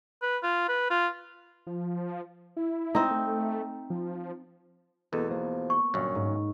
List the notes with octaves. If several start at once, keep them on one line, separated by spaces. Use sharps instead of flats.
B4
F4
B4
F4
F3
E4
C4 D#4
A3
F3
E2 B2 A#3 B3 A4
F3 A#3
C#6
G1 F#2 A#2 C#4
G#2